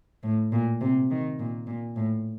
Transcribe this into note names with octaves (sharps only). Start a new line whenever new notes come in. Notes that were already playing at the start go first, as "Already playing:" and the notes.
A2
A#2
C3
D#3
A#2
A#2
A2